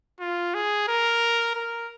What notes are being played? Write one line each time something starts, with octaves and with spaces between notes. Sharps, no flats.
F4
G#4
A#4
A#4